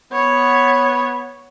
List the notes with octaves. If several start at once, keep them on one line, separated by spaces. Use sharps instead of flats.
B3 C#5